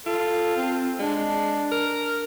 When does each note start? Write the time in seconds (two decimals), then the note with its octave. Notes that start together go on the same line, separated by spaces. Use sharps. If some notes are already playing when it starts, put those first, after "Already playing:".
0.06 F4 A4
0.57 C4
0.99 G#3 D4
1.72 A#4